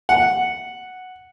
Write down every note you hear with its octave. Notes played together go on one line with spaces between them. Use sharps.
F#5